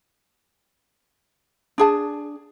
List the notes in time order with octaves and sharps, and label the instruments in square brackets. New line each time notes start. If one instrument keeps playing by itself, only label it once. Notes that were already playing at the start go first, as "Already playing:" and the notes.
[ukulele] D4 G#4 A5